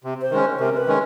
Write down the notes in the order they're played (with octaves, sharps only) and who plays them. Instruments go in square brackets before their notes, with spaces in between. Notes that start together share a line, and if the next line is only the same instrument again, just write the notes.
[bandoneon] C3
[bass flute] C5
[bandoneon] D#3 G#3 C#4
[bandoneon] C3 [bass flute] A#4
[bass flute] B4
[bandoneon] D#3 G#3 C#4